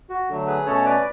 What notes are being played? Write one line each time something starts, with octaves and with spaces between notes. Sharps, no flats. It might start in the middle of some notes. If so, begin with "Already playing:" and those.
F#4
D3 F#3 A3
G#4 B4
B2 A3 C#4 A4 C#5
B4 D5